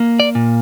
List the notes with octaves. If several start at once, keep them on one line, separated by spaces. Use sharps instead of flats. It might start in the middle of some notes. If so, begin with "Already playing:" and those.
Already playing: A#3
D5
A#2